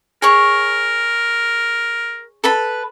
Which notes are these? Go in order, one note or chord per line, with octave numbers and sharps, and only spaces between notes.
G#4 A#4 C#5 C#6
A4 B4 B5